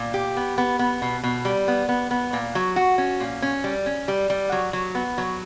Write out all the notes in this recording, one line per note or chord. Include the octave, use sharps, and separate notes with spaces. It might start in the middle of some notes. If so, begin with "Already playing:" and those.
Already playing: A#2
G4
B3
B3
B3
B2
B2
G3
B3
B3
B3
A#2
F#3
F#4
C#4
A#2
C#4
G3
C#4
G3
G3
F#3
F#3
B3
F#3